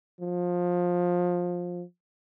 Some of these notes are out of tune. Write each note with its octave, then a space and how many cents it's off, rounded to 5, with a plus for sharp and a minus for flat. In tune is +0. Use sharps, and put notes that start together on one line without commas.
F3 +20